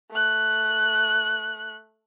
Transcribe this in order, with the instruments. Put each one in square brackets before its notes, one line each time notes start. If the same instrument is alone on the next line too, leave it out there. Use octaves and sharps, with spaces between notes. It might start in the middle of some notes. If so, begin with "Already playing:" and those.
[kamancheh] A3 F#6